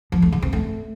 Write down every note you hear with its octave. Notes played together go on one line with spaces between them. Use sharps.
F3
A3
C#3
C4
A3